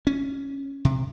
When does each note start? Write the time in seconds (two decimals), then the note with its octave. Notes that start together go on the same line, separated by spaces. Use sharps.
0.07 C#4
0.85 C3